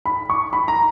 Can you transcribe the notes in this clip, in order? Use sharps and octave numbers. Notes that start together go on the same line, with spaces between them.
B5
C#6
B5
A#5